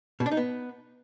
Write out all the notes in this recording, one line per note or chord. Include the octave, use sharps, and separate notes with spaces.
B2
D4
D#4
B3